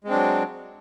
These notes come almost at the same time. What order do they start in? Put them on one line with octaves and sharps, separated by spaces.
G#3 C4 D4 F#3